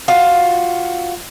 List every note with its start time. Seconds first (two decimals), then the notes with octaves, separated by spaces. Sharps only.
0.08 F4 F#4